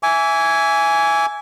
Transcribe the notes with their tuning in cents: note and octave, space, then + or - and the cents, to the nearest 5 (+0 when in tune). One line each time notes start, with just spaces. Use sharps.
E5 +0 G#5 +0 D6 -40